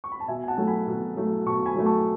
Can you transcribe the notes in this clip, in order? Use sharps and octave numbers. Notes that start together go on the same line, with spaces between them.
C#6
B5
A5
B2 E5 G#5
G#5
F#5 A5
F#3 A3
G#5 B5
B2
F#3 A3
B2 A5 C#6
G#5 B5
F#3 A3
A5 C#6